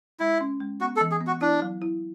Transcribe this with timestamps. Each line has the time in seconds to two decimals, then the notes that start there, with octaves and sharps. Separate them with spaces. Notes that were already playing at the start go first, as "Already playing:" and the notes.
0.20 G#3 E4
0.41 C#4
0.61 G#3
0.81 B3 F#4
0.96 A4
1.01 E3
1.11 G#4
1.21 B3
1.27 F#4
1.41 D4 E4
1.62 F#3
1.82 E4